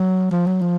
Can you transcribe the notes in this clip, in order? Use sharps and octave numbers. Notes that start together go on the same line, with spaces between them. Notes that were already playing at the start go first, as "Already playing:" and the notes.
Already playing: F#3
F3
F#3
F3